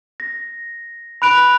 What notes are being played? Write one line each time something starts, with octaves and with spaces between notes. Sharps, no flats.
A#6
B5 F#6 D7 F7